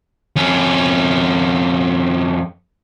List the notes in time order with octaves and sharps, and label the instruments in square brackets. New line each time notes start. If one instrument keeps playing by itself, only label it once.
[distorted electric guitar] F2 C#4